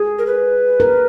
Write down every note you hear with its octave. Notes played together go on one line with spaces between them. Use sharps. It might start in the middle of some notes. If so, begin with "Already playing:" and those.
Already playing: G#4
A#4
B4
A#4